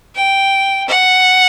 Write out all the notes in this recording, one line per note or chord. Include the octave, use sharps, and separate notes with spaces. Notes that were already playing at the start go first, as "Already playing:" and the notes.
G5
F#5